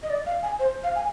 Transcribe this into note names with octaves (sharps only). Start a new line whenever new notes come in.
D#5
D5
F5
G#5
C5
F5
G#5